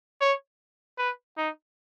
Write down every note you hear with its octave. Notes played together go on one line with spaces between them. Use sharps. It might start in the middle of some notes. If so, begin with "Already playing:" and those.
C#5
B4
D#4